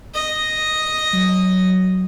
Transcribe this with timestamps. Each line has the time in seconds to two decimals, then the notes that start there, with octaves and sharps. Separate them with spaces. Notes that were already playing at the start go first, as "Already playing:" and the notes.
0.14 D#5
1.13 F#3